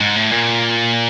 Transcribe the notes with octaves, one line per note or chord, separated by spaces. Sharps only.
G#2
A2
A#2